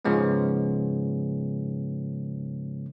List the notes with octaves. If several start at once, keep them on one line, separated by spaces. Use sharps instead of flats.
G#2 C#3 F3 G#3 B3 C#4